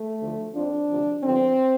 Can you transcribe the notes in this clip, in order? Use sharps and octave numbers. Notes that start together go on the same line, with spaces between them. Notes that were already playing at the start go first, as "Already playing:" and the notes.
Already playing: A3
D2 D3 F3
F2 F3 D4
D2 C3 F3
G2 D3 F3 C4